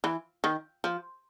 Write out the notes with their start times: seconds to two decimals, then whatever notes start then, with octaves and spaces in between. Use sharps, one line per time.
0.04 E3
0.44 D#3
0.84 F3